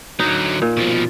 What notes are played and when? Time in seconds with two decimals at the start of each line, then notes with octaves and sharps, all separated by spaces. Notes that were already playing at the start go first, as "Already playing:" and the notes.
0.20 D3 F#3 D#4
0.62 A#2
0.77 B2 F3